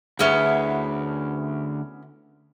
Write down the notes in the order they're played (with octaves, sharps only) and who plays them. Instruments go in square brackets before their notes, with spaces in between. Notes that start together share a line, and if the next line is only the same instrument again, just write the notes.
[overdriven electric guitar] D2 [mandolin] B3 C#4 E4 [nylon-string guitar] G#4 C#5 E5